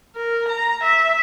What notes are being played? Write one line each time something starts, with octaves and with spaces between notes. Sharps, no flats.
A#4
A#5
E5